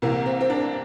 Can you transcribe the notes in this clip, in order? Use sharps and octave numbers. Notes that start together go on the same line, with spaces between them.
C2 C3 E3 A#3
C4
C4
D4